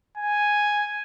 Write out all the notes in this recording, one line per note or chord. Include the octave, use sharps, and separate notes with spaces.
G#5